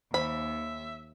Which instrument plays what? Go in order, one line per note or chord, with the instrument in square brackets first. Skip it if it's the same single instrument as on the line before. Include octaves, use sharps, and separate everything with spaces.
[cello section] D#2 [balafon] C5 [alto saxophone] E5 [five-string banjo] B5